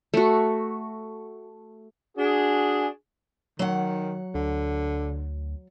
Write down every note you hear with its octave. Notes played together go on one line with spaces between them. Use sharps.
A3 F#4
D4 F#4 G#4
D#3 F#3 F#5
D2 D3